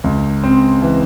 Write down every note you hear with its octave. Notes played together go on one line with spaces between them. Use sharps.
C#2
C4
E3